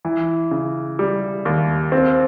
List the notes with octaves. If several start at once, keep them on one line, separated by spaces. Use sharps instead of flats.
E3
C#3
G3
D#2
C4